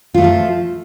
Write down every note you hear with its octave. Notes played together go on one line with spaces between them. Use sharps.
F3 F#3 A3 F4